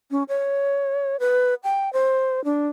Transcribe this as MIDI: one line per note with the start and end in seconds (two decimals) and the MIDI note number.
0.11 0.23 61
0.29 1.17 73
1.20 1.54 71
1.64 1.92 79
1.93 2.43 72
2.44 2.68 62